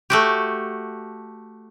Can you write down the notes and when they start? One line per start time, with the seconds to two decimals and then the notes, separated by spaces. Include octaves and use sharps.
0.10 A3 F#4 G4